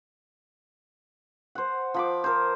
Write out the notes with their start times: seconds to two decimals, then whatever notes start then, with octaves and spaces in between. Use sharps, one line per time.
1.55 C5 F#5
1.94 F3 B5 D6
2.24 A#4 C5